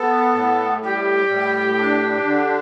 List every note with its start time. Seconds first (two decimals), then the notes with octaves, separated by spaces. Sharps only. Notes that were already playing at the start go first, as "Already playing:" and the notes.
Already playing: B3 A4
0.34 A2
0.82 G3 G4
1.30 A2
1.77 D4
2.25 D3